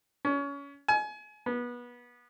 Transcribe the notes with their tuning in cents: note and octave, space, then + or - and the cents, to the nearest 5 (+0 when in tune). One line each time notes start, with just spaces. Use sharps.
C#4 +25
G#5 +30
B3 -25